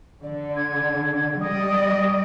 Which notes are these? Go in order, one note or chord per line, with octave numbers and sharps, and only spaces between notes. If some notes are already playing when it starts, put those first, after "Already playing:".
D3 D5
G#6
G3 D5 D#5 D#6